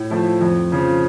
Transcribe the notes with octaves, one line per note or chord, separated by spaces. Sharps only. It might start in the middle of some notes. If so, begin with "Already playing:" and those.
Already playing: A2
F3 A3 E4
F2
C#3 F3